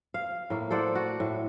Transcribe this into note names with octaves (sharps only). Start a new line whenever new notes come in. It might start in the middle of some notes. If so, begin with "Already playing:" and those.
F5
A2 A#3
A4 C5 D5 F#5
F#4
A2